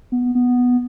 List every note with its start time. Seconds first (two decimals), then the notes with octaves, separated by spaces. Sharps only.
0.12 B3
0.35 B3